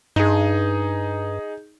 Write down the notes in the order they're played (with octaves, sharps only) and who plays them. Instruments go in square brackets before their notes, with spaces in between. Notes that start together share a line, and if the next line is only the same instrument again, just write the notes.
[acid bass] G2 [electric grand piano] D#4 G#4